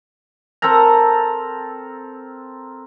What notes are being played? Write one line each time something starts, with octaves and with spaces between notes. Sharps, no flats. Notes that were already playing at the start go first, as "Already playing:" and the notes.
C4 A4 A#4 A#5